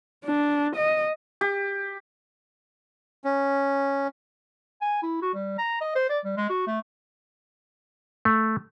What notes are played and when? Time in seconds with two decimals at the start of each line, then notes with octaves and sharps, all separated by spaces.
0.25 D4
0.76 D#5
1.41 G4
3.24 C#4
4.81 G#5
5.03 E4
5.22 F#4
5.34 G3
5.58 A#5
5.81 D#5
5.95 C5
6.09 D5
6.24 G3
6.37 G#3
6.50 F#4
6.67 A3
8.25 A3